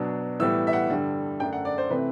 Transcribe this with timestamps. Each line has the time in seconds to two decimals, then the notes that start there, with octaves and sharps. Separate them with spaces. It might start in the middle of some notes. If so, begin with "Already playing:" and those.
Already playing: B2 F#3 B3 D4
0.39 A2 E3 G3 B3 E6
0.67 E5
0.73 F#5
0.90 G2 D3 G3
1.40 F#2 D3 A3 D4 G5
1.53 F#5
1.65 D5
1.78 C5
1.90 C3 E3 A3 C4 B4